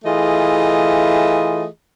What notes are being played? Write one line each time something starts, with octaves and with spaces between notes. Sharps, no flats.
E3 A3 F4 G#4 D#5